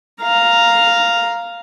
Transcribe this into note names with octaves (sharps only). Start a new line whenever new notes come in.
F5 A#5